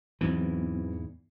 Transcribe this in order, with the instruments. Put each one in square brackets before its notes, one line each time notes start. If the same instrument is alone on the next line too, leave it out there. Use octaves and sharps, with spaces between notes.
[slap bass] E2 G#2 E3 [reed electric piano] F#3 B3 C4